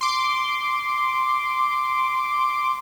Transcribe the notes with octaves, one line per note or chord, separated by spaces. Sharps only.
C6 D6